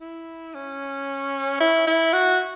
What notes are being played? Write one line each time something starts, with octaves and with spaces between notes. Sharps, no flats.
E4
C#4
E4
E4
F#4